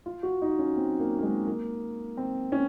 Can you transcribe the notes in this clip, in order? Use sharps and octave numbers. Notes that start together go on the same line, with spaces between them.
F4
F#4
D#4
C#4
C4
A#3
A#3
G#3
A#3
C4
C#4